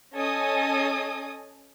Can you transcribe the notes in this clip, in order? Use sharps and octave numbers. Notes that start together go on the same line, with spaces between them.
C#4 A4 D#5 G#5 D#6